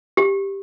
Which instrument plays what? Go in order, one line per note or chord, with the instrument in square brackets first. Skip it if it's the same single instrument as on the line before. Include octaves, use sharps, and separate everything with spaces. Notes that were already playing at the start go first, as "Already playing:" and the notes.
[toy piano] G4